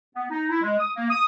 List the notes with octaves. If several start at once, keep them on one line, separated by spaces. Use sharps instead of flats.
B3
D#4
E4
G#3
D#6
A#3
D#6